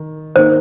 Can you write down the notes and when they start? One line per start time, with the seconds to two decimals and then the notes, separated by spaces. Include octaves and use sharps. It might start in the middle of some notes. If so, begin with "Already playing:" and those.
Already playing: D#3
0.36 D#3 A#3 D#4 A#4 C5